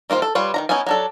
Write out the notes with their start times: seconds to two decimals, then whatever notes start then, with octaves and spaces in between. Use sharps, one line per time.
0.10 D#3 A#3 F4 C5
0.22 A4
0.35 G3 F4 B4 C#5
0.54 D#3 F#3 A#5
0.69 B3 C#4 D#4 E4 G#5
0.87 F#3 D4 A4